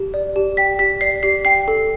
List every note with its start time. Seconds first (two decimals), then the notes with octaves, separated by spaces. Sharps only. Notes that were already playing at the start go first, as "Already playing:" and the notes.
Already playing: G4
0.14 D5
0.36 G4
0.57 G5 B6
0.79 G4 B6
1.01 D5 C7
1.23 G4 C7
1.45 G5 C7
1.68 A4